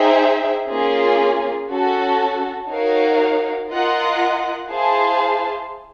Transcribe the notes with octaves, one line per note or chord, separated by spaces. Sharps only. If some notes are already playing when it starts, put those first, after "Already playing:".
Already playing: D#4 G#4 C5 E5 G5
A#3 C#4 F4 G#4
C#4 F#4 A4
D#4 F#4 A#4 C#5 F5
F4 A#4 D#5 F#5
E4 G#4 C5 F5 A5